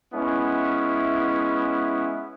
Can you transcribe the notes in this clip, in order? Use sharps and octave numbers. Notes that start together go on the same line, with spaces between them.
G#3 B3 C#4 E4